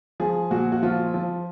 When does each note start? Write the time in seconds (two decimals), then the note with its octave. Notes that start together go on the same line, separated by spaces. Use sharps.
0.20 F3 G#4
0.51 A#2 F#4
0.72 F#4
0.83 F3 F4
1.14 F3